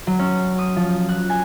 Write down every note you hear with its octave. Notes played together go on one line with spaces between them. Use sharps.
F#3
C#4
D#6
F3
F#6
G#5